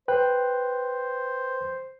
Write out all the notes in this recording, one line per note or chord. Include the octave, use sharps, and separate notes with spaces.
B4 C5 G5 F#6